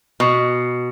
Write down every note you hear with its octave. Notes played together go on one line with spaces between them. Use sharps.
B2